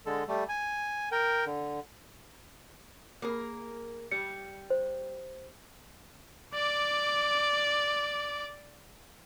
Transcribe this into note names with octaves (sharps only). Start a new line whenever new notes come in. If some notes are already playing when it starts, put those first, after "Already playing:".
D3 G#3 A4
G3 A3
G#5
A#4 G5
D3
A#3 G#4 A#4
G3 C#7
C5
D5 D6